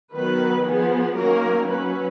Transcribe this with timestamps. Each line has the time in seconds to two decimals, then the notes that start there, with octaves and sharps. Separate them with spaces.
0.15 D#3 F#3 B3 B4
0.66 F3 B3 G#4
1.17 D#3 F#3 A#3 C#4 A#4
1.68 F#3 C#4 B4